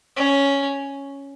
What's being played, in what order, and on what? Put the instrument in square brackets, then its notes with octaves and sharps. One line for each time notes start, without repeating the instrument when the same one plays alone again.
[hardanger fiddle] C#4